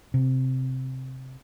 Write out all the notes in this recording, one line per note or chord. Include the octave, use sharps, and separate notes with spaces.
C3